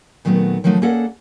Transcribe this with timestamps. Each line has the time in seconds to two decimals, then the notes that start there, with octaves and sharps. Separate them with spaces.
0.25 A#2 D#3 F#3 A3 B3
0.64 D#3 F3 F#3 A3 D#4
0.82 A#3 C#4 G#4 A4 D5 F#5